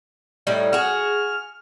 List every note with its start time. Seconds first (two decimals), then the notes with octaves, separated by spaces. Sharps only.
0.47 A2 G3 D#4
0.73 F#4 G#4 F6